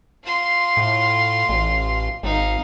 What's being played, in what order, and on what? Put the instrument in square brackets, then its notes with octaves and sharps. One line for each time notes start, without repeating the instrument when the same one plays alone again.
[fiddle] F4 C6
[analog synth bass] A2
A1
[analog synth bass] G#1 [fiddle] D#4 F5